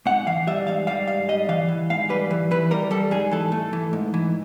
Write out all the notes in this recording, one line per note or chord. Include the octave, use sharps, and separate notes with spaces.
G#2 F#5
E3 F5
G3 E5
G#2 F5
G3 F5
G#2 F5
G3 D#5
E3 F5
E3
G#2 F5
G3 B4
E3
E3 B4
G3 A#4
G3 A4
G#2 G#4
E3 A4
A3
E3
G#2
E3